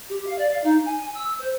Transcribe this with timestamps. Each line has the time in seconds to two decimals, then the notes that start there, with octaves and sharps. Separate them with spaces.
0.09 G4
0.26 F5
0.38 D5
0.51 F5
0.64 D#4
0.85 G#5
1.15 E6
1.39 C5